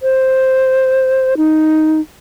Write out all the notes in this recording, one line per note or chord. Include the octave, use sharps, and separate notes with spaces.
C5
D#4